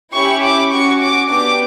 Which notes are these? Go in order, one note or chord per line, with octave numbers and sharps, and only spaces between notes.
C#4 E4 G4 C#6
D6
C#4 F#4 C#6
D6
B3 D4 G4 D6